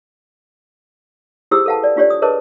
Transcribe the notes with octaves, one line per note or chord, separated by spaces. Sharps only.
E4 G4 G#4 C5 D#6 E6
A4 B4 F5 F#5 A5
D5
D4 F4 G4 C#5 D5
D#6
G#4 A#4 B4 C#5 D#5 A5